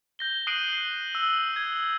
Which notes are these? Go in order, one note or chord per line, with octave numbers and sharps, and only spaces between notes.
G6 A#6 G7
D#6 F#6 C7 D7 D#7 F#7
E6
G#6